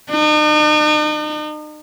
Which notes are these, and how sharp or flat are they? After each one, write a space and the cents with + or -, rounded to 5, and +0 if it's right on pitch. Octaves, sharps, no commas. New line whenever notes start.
D#4 -45